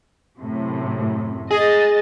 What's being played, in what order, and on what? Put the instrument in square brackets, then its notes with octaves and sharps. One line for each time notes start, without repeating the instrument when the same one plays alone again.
[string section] F#2 A2 C3
[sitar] G#4 [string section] D#5 A6